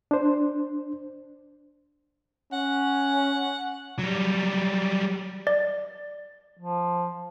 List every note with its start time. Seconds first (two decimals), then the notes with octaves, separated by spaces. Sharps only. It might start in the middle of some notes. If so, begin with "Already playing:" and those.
0.11 D4 C5
2.53 C#4 F#5
3.99 F#3 G3
5.47 D5
6.58 F3